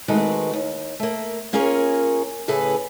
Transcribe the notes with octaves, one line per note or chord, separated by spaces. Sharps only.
D#3 G#3 A3 C4 F#4 B4
D#2
A3 A#3
A#3 C#4 F4 G#4 A#4 C#5
A2 C#3 G#4 A4 B4